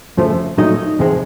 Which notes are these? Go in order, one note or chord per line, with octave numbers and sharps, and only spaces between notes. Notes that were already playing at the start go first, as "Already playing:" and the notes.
F2 C#3 F3 A3
A#2 F#3 A3 D#4 D#5
E2 C3 F3 G#3